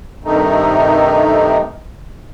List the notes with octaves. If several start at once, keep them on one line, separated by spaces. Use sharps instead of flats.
G2 C3 D#3 A3 D#4